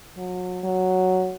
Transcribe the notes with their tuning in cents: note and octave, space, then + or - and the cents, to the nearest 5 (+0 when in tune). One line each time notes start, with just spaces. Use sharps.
F#3 -30
F#3 +0